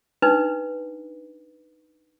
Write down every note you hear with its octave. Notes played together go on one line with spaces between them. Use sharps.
D4 D#4 B4